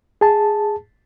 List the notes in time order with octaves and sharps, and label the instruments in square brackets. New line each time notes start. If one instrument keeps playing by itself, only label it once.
[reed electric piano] G#4 A5